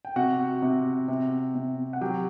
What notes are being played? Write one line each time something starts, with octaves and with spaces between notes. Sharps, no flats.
G5
C3 F#4 F#5
C3
C3
C3
F#5
F#3 G4 G5